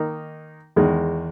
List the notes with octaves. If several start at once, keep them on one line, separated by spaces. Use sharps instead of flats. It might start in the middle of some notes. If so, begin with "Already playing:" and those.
Already playing: D#3 A#3 D#4 A#4
E2 D#3 G#3